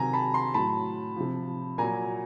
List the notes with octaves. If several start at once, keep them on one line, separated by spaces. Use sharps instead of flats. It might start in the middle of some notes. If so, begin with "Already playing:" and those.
Already playing: C3 D#3 F#3 G#5 A#5
A5 B5
A#5 C6
A2 F#3 A5 B5
C3 F3
A#2 F#3 G#5 A#5